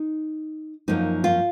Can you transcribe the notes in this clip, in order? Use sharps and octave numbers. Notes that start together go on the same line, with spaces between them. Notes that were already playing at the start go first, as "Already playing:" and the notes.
Already playing: D#4
F#2 F3 A#3 D#4
F4